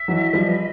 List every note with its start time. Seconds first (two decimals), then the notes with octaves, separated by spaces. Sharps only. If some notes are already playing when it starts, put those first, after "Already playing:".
Already playing: E5
0.08 E3 F#3 D#5
0.33 F3 G3
0.45 B4